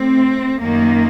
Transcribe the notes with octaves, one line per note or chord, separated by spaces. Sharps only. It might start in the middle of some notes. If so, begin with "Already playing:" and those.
Already playing: A2 C4
F#2 D#3 A#3